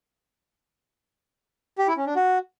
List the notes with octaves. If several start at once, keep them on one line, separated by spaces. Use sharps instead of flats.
G4
E4
C#4
D4
F#4